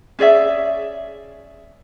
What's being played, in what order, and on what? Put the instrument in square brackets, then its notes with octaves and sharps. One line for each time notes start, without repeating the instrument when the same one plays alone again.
[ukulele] C#4 G#4 D5 E5